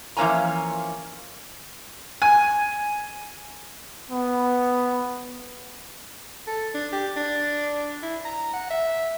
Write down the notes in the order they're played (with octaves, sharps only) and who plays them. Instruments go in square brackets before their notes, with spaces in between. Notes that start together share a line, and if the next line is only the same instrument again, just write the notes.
[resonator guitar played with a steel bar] E3 F3 A#3 C#4 G#5 A#5
[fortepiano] G#5
[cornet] B3
[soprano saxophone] A4
D4
G4
D4
E4
A#5
F#5
E5